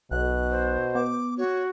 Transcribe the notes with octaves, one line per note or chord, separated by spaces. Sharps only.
B1 B2 F#6
C5
B3 D6
F#4 C#5